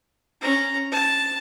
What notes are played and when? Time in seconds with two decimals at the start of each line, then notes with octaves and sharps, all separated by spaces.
0.42 C#4 A#5
0.92 A5